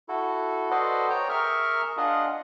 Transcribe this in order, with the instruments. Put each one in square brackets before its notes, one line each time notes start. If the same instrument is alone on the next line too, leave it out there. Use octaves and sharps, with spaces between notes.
[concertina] E4 F#4 A4
F#4 A4 B4 C5 D5 D#5
C#5 G5 A#5
G#4 A#4 E5 C#6 F6
D4 F4 G#4 D#5 F#5